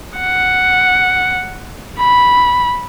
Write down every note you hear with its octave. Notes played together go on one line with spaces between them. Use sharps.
F#5
B5